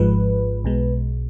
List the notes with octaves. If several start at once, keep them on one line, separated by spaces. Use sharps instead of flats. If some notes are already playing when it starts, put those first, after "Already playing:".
Already playing: G#1 G#2 F3 G#3 B4
B1 B2 G#3